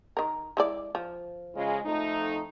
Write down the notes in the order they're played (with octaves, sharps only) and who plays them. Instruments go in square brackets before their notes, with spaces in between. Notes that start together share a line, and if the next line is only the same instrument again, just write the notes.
[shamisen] D#3 A#4
G#3 E4 D5
F3
[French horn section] C#3 G#3 F4
F2 A3 D#4